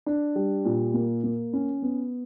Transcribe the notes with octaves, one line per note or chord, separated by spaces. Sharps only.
D4
G3
A#2
A#3
A#3
C#4
B3